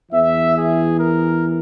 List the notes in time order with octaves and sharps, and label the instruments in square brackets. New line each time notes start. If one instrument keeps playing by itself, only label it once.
[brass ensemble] E2 E3 E5
G#4
A#4